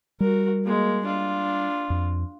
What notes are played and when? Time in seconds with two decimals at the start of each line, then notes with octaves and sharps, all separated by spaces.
0.20 G3 F#4 A#4
0.65 G#3 A#3
1.05 D4 F4
1.90 F2